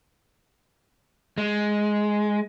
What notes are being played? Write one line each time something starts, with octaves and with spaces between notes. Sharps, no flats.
G#3